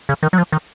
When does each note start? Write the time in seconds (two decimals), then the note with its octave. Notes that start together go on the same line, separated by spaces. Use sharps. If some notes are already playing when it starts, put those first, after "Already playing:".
0.09 C#3
0.23 D#3
0.33 F#3
0.38 F3
0.52 D#3